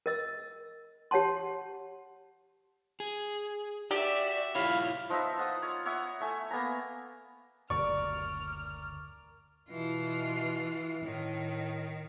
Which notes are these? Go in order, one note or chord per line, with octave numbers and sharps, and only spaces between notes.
A#4 D#5 E6
G4 C#5 F#5 A5 C6
G#4
F#4 G4 D5 E5
E4 F4 C#5 F5 B5
F3 D#4 B4 E5
F4 F#5 D#6
C#5
C#5 E5 F#5 D#6
A3 E5 G#5
A#3 B3 G#5 A#5
F#1 D2 A#4 D5 C#6 F6
B2 E3 F4
A2 D#3